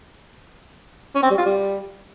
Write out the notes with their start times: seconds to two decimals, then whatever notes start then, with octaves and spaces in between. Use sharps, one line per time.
1.15 C#4
1.23 C4
1.30 G3
1.38 F4
1.46 G3